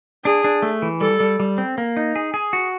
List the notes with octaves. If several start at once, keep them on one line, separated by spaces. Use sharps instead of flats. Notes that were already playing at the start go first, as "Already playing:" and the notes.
D4 G#4
D4
A3
E3
G3 A4
G3
G3
C4
A#3
D#4
G#4
G#4
F#4